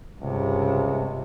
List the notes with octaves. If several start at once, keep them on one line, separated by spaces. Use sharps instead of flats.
C#2 G2 C3